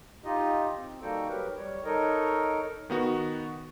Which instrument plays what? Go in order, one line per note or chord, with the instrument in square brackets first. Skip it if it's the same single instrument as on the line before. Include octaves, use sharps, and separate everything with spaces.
[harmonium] D#4 F4 G4 D#5
C4
G3 A#3 D#4 F#4 A4 G5
F#3 G4 A#4 B4
G3 C#5
D#4 A4 A#4 C#5 D#5
[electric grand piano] D#3 B3 F#4